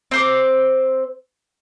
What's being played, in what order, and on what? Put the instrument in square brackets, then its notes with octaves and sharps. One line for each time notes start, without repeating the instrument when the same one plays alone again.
[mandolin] C4 C5 D6